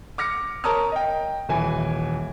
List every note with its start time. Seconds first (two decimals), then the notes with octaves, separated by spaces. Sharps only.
0.18 D6 F6 A#6 C#7
0.64 A#4 C#5 A5 A#5 D#6 F6
0.92 D#5 G5
1.49 D#1 E3 G#5